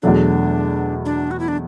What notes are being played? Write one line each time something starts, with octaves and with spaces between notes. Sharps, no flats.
E2 B2 F#3 A3 D4
D4
F#4
E4
D4